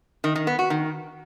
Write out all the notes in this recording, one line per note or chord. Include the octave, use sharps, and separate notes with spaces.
D#3
D#3
B3
F#4
D#3